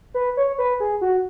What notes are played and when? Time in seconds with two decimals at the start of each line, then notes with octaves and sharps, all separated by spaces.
0.14 B4
0.37 C#5
0.58 B4
0.80 G#4
1.01 F#4